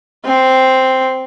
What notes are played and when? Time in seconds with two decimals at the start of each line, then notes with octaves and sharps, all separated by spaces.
0.25 C4